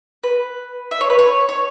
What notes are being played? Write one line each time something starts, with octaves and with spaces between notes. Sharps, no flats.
B4
E5
C#5
B4
C#5
C#5